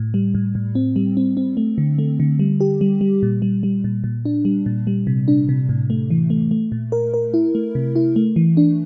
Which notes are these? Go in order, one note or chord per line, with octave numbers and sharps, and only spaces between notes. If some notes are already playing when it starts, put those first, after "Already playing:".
Already playing: A2
G3
A2
A2
C4
G3
C4
C4
A3
D3
A3
D3
G3
G4
G3
G3
A#2
G3
G3
A#2
A#2
D4
G3
A#2
G3
C3
D4
C3
A2
A3
E3
A3
A3
A#2
A#4
A#4
E4
A3
C3
E4
A3
E3
D4